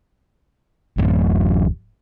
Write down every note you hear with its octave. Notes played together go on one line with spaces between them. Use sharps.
D1 A1 F#2